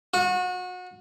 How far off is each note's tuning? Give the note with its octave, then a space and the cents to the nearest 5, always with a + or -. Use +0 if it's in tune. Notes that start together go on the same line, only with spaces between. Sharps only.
F#4 -30